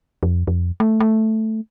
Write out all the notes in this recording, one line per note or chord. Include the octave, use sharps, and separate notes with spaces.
F2
F2
A3
A3